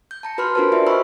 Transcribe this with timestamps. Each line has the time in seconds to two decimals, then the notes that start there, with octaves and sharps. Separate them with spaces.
0.11 G6
0.23 A5 A#5 C#7
0.38 F#4 B4 B5 C6 F6
0.55 D4 F4 F#4 A#4 C5 A5
0.72 F4 G4 D5 E5
0.87 B4 C5 D#5 B5 C#6 E6